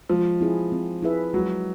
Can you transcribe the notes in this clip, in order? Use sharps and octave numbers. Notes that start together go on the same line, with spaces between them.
F3 G#3
C4 E4 G#4
C4
E4 G#4 B4 E5
F#3 G#3